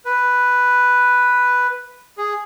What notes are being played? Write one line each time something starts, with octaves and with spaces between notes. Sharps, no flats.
B4
G#4